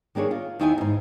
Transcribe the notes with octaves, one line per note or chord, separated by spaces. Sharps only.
D#3 A#3 D4 G#4 C#5
F4
D#2 D#3 D#4 E4 G5 G#5
E2 G#2